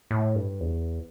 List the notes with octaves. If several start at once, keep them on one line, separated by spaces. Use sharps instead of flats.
A2
G2
E2